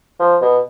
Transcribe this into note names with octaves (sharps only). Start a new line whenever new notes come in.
F3
B2